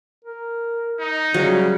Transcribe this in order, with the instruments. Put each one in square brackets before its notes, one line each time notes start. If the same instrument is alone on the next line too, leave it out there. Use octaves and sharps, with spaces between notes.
[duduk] A#4
[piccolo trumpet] D#4
[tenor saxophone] C#3 [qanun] F#3 [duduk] G3